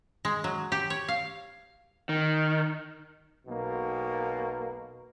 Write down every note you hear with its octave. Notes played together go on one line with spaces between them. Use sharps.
G#3
F#3
G4
C#5
F5
D#3
B1 B2 A#3